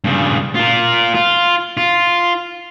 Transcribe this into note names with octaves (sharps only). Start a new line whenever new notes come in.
G2 C#3
F4 A#4
F4
F4